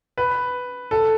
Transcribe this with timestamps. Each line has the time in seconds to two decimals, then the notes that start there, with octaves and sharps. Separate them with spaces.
0.18 B4
0.91 A4